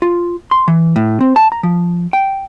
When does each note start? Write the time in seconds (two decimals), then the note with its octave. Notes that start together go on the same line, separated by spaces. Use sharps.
0.02 F4
0.51 C6
0.68 E3
0.96 A2
1.21 C4
1.36 A5
1.52 A#5
1.63 F3
2.13 G5